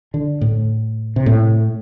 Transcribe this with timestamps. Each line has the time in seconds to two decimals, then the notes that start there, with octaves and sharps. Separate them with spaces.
0.14 D3
0.41 A2
1.16 C3
1.26 A2